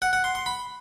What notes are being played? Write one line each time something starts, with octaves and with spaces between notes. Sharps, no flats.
F#5
F#5
C6
C6
B5